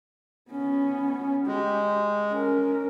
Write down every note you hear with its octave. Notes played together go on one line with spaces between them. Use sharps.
B3 C#4
G#3 G4
C#4 A#4